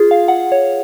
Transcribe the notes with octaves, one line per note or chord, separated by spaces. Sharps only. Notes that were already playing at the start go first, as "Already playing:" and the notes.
Already playing: F4 G#4
F5
F#5
C#5